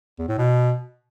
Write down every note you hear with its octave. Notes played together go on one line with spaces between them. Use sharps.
E2
A2
B2